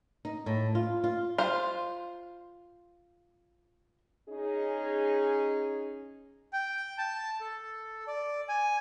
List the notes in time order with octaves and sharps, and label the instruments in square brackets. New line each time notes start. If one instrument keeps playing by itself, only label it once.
[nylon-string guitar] D#4
A2
F4
F4
[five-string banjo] F4 C5
[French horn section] C#4 D#4 G#4
[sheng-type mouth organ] G5
A5
A4
D5
G#5